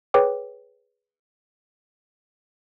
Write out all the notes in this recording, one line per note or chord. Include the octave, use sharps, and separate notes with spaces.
G#4 B4 C#5 G5 D6